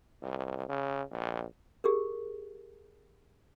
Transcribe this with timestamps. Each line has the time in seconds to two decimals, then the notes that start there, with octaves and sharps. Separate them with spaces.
0.23 C2
0.69 C#3
1.11 A#1
1.84 G4 G#4 A#4